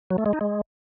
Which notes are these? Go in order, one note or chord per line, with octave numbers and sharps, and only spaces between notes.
F#3
A3
G#3
D#4
G#3